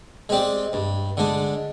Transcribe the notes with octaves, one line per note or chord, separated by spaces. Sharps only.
G#3 C4 G4 D5
G2
D3 G#3 D4